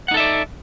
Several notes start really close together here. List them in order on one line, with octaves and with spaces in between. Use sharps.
F#5 D#4 A4 E5 D5